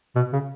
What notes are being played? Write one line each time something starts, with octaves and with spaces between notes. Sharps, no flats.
B2
C#3